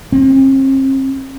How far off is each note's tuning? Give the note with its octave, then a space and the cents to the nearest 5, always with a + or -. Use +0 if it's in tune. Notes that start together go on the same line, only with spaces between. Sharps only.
C4 +45